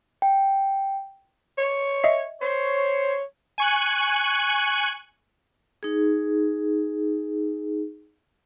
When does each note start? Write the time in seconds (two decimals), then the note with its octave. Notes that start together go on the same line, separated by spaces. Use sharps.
0.22 G5
1.58 C#5
2.04 D#5 E5 C7
2.42 C5 C#5
3.58 G#5 C#6 F#6
5.83 D#4 G#4